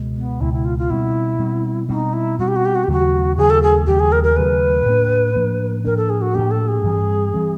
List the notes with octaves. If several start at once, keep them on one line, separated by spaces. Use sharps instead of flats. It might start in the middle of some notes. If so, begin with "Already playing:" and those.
Already playing: C#2 B2 G#3
B3
C#2 B2 G#3 E4
E4
F4
F4
B2 G3 C4 E4
B2 G3 C4
B2 G3 C4 D#4
E4
B2 G3 C4 F#4
G4
F#4
G4
F#4
G4
D#2 C#3 F#3 A3 F#4
D#2 C#3 F#3 A3 G#4
A4
G#4
D#2 C#3 F#3 A3 G4
G#4
A#4
A#4
D#2 C#3 F#3 A3 B4
A2 F3 A#3 D4
A2 F3 A#3 D4
A2 F3 A#3 D4 A#4
A4
G#4
F#4
A2 F3 A#3 D4 G4
A4
G#4
G2 E3 G3 C4
E3 G3 C4